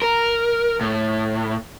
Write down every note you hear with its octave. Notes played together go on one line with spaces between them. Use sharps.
A#4
A2